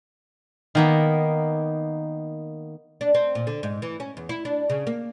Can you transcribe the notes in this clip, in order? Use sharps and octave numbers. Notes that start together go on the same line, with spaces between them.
D#3 A#3 B3
D4
C4
A#2
D3
G#2
E3
C#4
E2
E4
D4
C#3
A#3